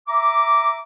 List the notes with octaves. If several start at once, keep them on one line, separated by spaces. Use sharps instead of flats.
E5 A#5 D6